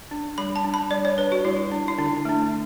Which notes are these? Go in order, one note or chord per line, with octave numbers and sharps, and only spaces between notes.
D4
G3 B5
A5
D4
B5
G3 D5
C#5
D4 B4
F#4
G3 E4
D4
E4
D3 D4
A3 D4